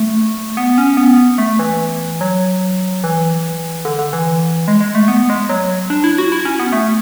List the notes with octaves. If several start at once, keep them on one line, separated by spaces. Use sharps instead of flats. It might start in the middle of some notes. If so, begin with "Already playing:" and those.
Already playing: A3
B3
C#4
B3
A3
E3
F#3
E3
D3
D3
E3
G#3
G#3
A3
B3
G#3
F#3
D4
E4
F#4
E4
C#4
B3
A3